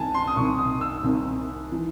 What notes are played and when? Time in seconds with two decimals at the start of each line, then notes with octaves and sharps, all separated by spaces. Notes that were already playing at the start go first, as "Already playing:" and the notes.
Already playing: C2 C3 D#3 G#5 A5
0.14 C6
0.27 D#6
0.36 C2 C3 D#3 C#6
0.59 D#6
0.81 E6
1.03 C2 C3 D#3
1.72 E3